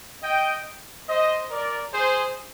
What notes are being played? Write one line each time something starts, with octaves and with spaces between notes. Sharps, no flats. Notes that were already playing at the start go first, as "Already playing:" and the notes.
D#5 G5
C5 D#5
A#4 D5
G#4 C5